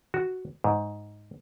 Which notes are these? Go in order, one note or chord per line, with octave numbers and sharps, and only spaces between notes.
F#4
G#2